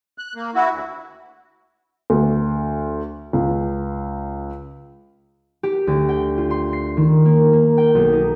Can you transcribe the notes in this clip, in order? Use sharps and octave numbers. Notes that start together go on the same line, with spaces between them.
F#6
A#3
E4 F#4
D2
D2
C#2
G4
D2
G5
F4
C6
C7
D#3
A#3
A#3
G5
B1
D#4